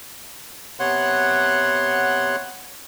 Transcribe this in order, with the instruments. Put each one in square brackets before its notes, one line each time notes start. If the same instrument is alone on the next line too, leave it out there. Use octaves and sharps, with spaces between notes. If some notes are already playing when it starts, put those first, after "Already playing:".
[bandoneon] C3 B3 C#5 F#5 C6 F#6